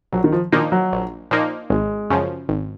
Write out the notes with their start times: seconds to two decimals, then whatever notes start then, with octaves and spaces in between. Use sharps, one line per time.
0.12 A#1 F#3
0.24 D#3
0.32 F3
0.52 A#2 D#3 F3 A#3 D#4
0.72 F#3
0.92 A#1
1.31 A#2 F3 A#3 D#4
1.70 G#1 G#3
2.10 F#2 C#3 F3
2.48 G#1